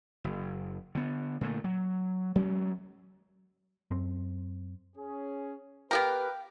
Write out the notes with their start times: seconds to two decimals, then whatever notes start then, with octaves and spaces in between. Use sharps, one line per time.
0.24 F#1
0.95 D3 B3
1.41 A#2 D3 A3
1.64 F#3
2.36 F#3 G#3 C4 C#4
3.91 F#2 C4
4.97 C#4 G#4
5.91 B3 G4 A#4 B4 F5 G5